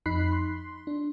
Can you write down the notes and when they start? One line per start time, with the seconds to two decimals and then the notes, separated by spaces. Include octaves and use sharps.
0.06 F2 D#4 B5 F#6 B6 C7
0.32 C6
0.87 D4